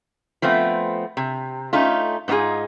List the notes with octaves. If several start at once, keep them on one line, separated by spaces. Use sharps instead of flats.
F3 A3 B3 C4
C3
A3 C#4 D#4 F4
G#2 B3 D#4 F4 G#4